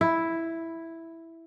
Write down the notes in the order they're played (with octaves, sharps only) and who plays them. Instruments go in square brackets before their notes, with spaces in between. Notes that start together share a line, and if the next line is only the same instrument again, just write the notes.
[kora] E4